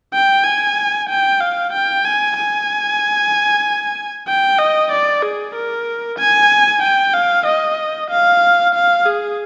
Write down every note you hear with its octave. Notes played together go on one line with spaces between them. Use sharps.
G5
G#5
G5
F5
G5
G#5
G#5
G5
D#5
D5
G#4
A#4
G#5
G5
F5
D#5
F5
F5
G#4